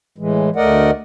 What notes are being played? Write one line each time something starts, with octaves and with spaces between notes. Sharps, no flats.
A2 E3 G#3
D2 A3 A#4 D5 D#5 F#5